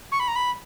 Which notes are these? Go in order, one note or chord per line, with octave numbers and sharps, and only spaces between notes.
C#6
B5
A#5
B5